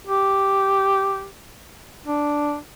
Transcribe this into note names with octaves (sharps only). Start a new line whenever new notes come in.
G4
D4